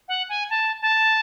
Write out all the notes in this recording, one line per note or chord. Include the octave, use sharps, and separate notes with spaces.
F#5
G#5
A5
A5